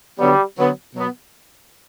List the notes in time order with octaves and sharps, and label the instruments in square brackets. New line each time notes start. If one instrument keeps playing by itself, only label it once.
[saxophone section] D3 F#3 B3 [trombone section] G3
[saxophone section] D3 F#3 B3
B2 F#3 B3